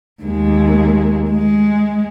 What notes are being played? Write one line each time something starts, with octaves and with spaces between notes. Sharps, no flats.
D#2 G#3
G#3